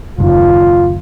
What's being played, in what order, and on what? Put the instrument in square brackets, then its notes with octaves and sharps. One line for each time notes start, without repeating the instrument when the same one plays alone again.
[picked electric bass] F#1 D#2 [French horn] F4